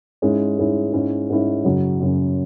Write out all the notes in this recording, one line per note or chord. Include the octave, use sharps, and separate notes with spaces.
G#2 G#3 C#4 E4
G#2 G#3 C#4 E4
G#2 G#3 C#4 E4
G#2 G#3 C#4 E4
F#2 C#3 F#3 C#4
F#2 C#3 F#3 C#4